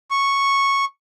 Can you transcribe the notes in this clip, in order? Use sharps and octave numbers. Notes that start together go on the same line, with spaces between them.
C#6